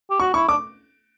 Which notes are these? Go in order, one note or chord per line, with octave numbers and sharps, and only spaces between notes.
G4
F#4 C#6
E4 C#6
D4 D6